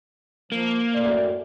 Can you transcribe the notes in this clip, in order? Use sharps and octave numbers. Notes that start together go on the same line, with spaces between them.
F3 A#3
F#2 A2 D5